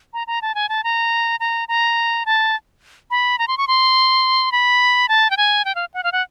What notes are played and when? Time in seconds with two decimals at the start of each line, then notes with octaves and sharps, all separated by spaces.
0.14 A#5
0.27 A#5
0.42 A5
0.55 G#5
0.69 A5
0.84 A#5
1.40 A#5
1.68 A#5
2.26 A5
3.11 B5
3.39 A#5
3.48 C6
3.58 C#6
3.68 C6
4.52 B5
5.09 A5
5.30 G5
5.37 G#5
5.65 G5
5.75 F5
5.94 F#5
6.04 F5
6.12 F#5